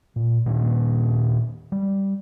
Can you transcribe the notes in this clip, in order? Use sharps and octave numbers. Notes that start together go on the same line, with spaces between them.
A#2
A#2 D#3 A#3 D4
G3